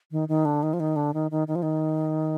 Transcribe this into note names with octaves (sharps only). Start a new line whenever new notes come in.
D#3
D#3
D3
D#3
F3
D#3
D3
D#3
D#3
D#3
F3
D#3